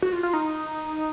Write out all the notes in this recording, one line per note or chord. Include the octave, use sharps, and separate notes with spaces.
F#4
F4
F4
D#4